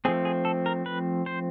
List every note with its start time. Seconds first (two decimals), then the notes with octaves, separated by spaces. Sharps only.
0.05 F3 A3 C4 G#4
0.25 G#4
0.45 A4
0.66 A#4
0.86 B4
1.26 C5